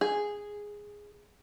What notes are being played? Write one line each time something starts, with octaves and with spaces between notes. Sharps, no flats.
G#4